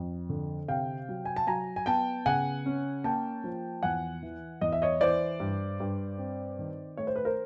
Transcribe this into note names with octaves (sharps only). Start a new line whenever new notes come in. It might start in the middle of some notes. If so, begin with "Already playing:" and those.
Already playing: F2
D3
C3 F5 G5
F#3
G#5
A5
F#3 G#5 A#5
G#5
B3 G5 A5
C#3 F#5 G#5
C#4
A#3 G5 A5
F3
E2 F#5 G#5
E3
E2 D#5
E5
C#5 D#5
E3 C5 D5
G2
G2
C4
D#3
A3 C#5
C5
B4
A#4 C5